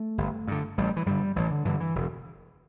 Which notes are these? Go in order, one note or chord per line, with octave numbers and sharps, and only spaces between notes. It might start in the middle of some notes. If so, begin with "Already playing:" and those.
Already playing: A3
G1
G2 D3
A1 G3
E3
G2 D3 G3
A1 E3
D3
G2 D3 E3
E3
E1